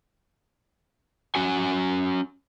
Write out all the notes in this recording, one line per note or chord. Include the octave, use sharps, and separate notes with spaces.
C#4 F#4 G#5